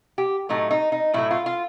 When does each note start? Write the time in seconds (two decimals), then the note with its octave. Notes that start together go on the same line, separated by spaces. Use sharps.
0.18 G4
0.49 A2 F#3 A3 D#4
0.71 D#4
0.92 D#4
1.14 A2 F#3 A3 E4
1.31 F4
1.46 F4